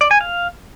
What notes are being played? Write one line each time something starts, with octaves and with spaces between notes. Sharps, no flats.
D5
G#5
F5